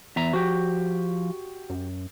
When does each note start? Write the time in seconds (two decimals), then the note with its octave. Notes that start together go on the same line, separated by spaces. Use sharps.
0.16 E2 E5 A#5
0.33 F3 F#4 G4
1.70 F#2